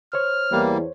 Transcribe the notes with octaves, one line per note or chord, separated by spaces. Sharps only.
C5 C#5 F6
E2 G3 A#3